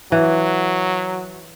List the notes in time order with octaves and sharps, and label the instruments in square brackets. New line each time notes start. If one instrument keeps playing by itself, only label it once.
[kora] E3 [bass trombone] F#3